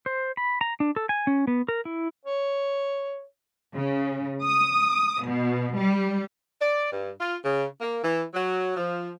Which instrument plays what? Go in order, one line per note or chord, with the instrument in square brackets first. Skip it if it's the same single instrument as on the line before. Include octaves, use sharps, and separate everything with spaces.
[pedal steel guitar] C5
B5
A#5
D4
A4
G#5
C#4
B3
A#4
E4
[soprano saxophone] C#5
[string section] C#3
D#6
B2
G3
[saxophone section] D5
G2
F4
C#3
A#3
E3
F#3
F3